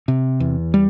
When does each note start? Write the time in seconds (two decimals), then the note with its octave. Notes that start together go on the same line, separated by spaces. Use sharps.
0.08 C3
0.40 E2
0.74 G3